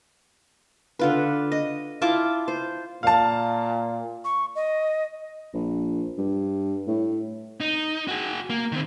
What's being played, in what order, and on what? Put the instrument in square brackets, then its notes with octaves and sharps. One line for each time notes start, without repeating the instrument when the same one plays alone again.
[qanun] D3 F4 B4
D#5
E4 F4 A5 D6
C5
[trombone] A#2 [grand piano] F5 A5
[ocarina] C#6
D#5
[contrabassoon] A#1
G2
A2
[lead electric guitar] D#4
F#4 G#4
A#3
D#3 C4